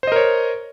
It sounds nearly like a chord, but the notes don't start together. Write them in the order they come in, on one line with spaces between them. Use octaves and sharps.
C5 D#5 A#4 C#5